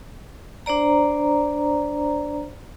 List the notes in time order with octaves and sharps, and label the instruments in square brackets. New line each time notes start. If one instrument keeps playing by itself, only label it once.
[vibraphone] D4 C5 D5 A#5